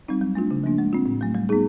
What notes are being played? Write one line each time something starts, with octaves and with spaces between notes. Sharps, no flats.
G3 C4 D#4
F#3
A3 D4 F4
C#3
F3 A#3 D4
G#3
C4 F4
A2
F#3 A3
G3
B3 D#4 G#4